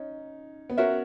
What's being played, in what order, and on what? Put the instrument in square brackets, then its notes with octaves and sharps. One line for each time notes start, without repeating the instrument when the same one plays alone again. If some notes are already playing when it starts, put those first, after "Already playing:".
Already playing: [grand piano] C#4 D#4
B3
[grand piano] C#4 [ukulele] F#4 A#4 E5